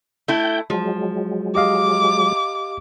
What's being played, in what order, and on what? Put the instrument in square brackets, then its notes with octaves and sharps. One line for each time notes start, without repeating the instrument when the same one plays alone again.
[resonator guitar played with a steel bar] A3 E4 [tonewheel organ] G5 G6
[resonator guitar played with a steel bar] F3 [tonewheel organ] F#3 G#3
[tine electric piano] G4 D#5 F5 [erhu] D6